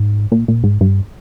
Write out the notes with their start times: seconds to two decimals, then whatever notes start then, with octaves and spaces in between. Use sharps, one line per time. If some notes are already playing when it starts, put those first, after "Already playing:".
Already playing: G#2
0.32 A#2
0.48 A#2
0.64 G#2
0.81 G2